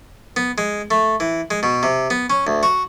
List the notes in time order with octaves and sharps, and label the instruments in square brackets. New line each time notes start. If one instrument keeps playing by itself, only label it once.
[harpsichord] B3
G#3
A3
E3
G#3
B2
C3
B3
C#4
D2
F#4